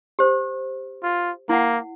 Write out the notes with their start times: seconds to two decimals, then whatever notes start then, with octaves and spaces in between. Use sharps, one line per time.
0.19 G4 C5
1.03 F4
1.49 A#3 E4 F#5